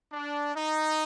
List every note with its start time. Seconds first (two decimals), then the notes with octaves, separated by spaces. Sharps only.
0.12 D4
0.55 D#4